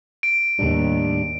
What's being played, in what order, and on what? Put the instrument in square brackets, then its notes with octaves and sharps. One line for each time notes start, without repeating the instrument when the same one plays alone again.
[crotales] D7
[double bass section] D#2 [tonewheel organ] A2 G3 D4